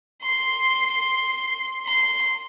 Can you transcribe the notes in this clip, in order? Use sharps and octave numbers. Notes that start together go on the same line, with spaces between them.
C6
C6